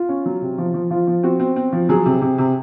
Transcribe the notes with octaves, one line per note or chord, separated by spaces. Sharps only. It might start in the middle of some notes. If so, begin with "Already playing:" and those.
Already playing: F4
C#4
F#3
C3
F3
F3
F3 F4
F3
C4 F#4
C4
C4
F3
F#3 G#4
C3
C3
C3